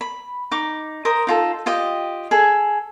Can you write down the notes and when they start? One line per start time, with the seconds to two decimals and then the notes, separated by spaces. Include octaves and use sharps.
0.01 B5
0.51 D#4 D6
1.05 A#4 C5 D#6
1.27 D#4 F4 A4
1.66 F4 G4 D#5 G5
2.31 G#4 A4